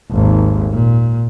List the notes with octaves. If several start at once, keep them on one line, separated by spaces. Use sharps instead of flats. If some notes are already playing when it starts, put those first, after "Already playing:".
G#1 D#2
A#2